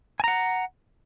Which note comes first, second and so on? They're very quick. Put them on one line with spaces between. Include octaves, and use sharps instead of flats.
G#5 A#5 F#5